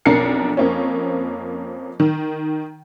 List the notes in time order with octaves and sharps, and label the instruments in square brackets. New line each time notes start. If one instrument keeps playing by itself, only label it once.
[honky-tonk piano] B1 F2 D4 A#4 C7 C#7
F2 A#3 C4 C#4
D#3